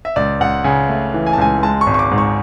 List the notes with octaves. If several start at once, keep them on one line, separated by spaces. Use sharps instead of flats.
E5
C#2 D5
C#2 F#5
C#3 G#5
A3
E3
G#5
A5
C#2 G#5
G#3 A5
C#6
G#1
C#6
D6
G#2
C#6